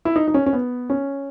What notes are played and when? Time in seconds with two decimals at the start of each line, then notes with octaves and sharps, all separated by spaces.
0.05 E4
0.16 D#4
0.28 D#4
0.34 C#4
0.46 C#4
0.53 B3
0.90 C#4